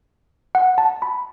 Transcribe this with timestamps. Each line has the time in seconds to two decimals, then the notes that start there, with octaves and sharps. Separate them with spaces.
0.55 F#5
0.78 A5
1.02 B5